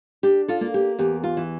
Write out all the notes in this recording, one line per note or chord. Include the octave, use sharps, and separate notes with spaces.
D4 G4
F4 A4
A#3
G4
E2 G4
F4
E3